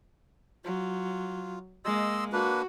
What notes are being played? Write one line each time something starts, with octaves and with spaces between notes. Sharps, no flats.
F#3 F4
G#3 A#3 D#5 C6 E6
A#3 D4 F#4 B4